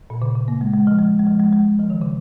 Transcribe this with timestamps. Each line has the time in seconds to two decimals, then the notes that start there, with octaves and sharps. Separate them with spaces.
0.10 A#2
0.22 C#3
0.35 C#3
0.48 A#3
0.61 G#3
0.74 G#3
0.87 F3
0.99 G#3
1.19 G#3
1.27 F3
1.40 G#3
1.53 G#3
1.79 F3
1.90 D#3
2.01 C#3